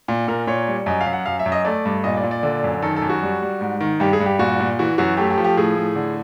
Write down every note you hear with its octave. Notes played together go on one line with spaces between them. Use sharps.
A#2
A#2 A#4
A#2 C#5
G3
F#2 D#5
F5
F#2
F#5
F#2 F5
E5
F#2
D#5
A3 D5
G2
A#2 D#5
D5
A#2
D5
D3
F#2
D#3 A4
A4
F#2
F#4
G3
G3
G#2
D#3
G2 G4
G#4
G2
G4
A#2 F#4
A#2
E3 F#4
F#2 F#4
A3 G4
G4
F3
G4
A2 G#4
A2
D3